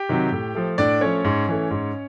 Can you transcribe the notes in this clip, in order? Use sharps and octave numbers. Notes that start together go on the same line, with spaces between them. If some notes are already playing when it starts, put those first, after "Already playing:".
Already playing: G4 G5
C3 D#3 F#3
A2
F3 A3
A2 D4 D5
F3 A3 C#4 C#5
G#2
E3 A3
G#2